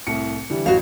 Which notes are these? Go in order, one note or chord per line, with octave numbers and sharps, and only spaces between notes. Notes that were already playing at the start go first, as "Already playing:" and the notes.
C2 A2 C#7
D3 E3 G3
A1 F#4 F5